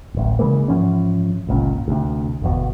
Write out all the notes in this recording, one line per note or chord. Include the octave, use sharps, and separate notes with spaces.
D1 A1
C#3 E3 G#3 A#3
G#2 E3 F3 C#4
G1 C#2 A#2 C#4
D2 C3
G1 E2 B2